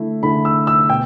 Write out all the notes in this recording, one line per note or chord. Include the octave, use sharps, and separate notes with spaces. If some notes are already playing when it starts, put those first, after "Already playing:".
Already playing: D3 A3 E4
D3 A3 E4 B5
E6
E6
B2 G5